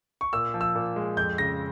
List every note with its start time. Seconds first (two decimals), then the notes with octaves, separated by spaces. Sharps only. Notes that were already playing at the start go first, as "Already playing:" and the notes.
0.21 C#6
0.33 A#2 E6
0.54 F3
0.61 E6
0.75 A#2
0.96 G#3
1.17 F2 G6
1.38 C#3 A#6